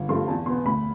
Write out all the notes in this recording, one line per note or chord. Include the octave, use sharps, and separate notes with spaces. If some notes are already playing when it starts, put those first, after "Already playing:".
Already playing: G1
G2 F3 A3 C6
E2 A5
B2 B3 C6
D2 B5